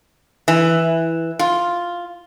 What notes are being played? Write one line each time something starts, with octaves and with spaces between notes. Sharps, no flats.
E3
F4